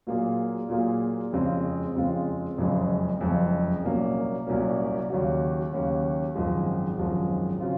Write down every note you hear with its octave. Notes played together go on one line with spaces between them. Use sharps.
A#2 F#3 A#3 F4 G#4
A#2 F#3 A#3 F4 G#4
F2 C#3 G#3 C4 F4
F2 C#3 G#3 C4 F4
F#1 F2 C#3 G#3
F#1 F2 C#3 G#3
C2 A#2 F#3 A#3 C#4
C2 A#2 F#3 A#3 C#4
D#2 C#3 F#3 C#4 F#4
D#2 C#3 F#3 C#4 F#4
G#1 F#2 F3 G#3
G#1 F#2 F3 G#3
C#3 F#3 C4 F4